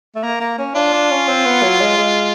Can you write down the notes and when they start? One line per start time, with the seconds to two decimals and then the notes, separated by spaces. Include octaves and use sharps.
0.16 A3
0.23 A#3
0.40 A#3
0.58 C#4
0.75 D4 F4
0.93 D4
1.11 C#4
1.28 C4
1.45 B3
1.63 F#3
1.81 G#3
1.98 G#3